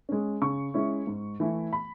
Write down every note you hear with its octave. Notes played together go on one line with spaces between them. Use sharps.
G#3 C#4
C#3 C#6
G#3 C#4 E4
G#2
E3 A3 E4
B5